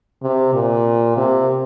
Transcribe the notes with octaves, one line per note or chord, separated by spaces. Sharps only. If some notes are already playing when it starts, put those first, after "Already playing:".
C3
A#2
C3